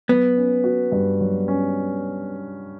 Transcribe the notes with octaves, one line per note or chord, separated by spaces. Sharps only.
F#3 B3
C#4
F#4
G2
F#3
C#4